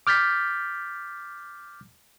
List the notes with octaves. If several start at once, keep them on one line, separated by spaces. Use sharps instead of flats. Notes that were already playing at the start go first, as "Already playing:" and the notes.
D6 F6 G6 A6 B6